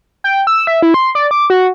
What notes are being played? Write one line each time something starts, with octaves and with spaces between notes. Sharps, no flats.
G5
E6
E5
E4
C6
D5
D6
F#4